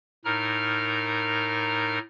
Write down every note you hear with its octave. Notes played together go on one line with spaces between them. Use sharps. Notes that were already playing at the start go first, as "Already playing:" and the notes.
A2 D#4 A#4 A#5 F6